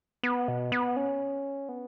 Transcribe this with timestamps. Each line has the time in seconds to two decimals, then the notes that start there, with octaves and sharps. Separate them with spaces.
0.23 B3
0.48 B2
0.72 B3
0.96 C#4
1.69 B3